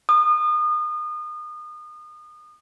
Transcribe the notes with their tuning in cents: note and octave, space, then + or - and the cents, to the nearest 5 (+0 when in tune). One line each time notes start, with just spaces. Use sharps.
D#6 -30